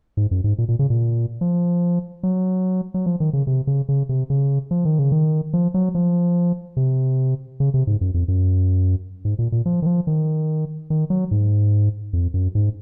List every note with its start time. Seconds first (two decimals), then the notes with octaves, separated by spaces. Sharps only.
0.17 G#2
0.31 F#2
0.44 G#2
0.58 A#2
0.69 A#2
0.79 C#3
0.90 A#2
1.41 F3
2.23 F#3
2.94 F#3
3.06 F3
3.20 D#3
3.33 C#3
3.47 C3
3.67 C#3
3.89 C#3
4.09 C3
4.30 C#3
4.71 F3
4.85 D#3
4.98 C#3
5.12 D#3
5.53 F3
5.74 F#3
5.95 F3
6.77 C3
7.60 C#3
7.74 C3
7.87 G#2
8.01 F#2
8.14 F2
8.28 F#2
9.25 G#2
9.39 A#2
9.52 A#2
9.66 F3
9.82 D#3
9.86 F3
10.07 D#3
10.90 D#3
11.10 F#3
11.31 G#2
12.13 F2
12.34 F#2
12.55 G#2